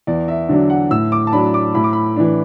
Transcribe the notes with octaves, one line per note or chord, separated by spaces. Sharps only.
E2 D5
E5
D3 F#3 D4
F#5
A2 E6
D6
A5
F#3 D4 B5
D6
A2 B5
D6
B5
E3 D4